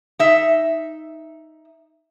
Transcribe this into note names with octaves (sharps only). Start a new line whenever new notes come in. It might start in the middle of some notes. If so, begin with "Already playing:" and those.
D#4 E5